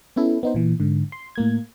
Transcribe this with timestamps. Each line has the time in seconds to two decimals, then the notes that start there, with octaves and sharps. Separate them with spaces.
0.16 B3 C#4 E4 A4
0.43 B3 D#4 C5
0.55 A#2 E3
0.80 G#2 D3
1.12 C6
1.36 A2 A#3 G#6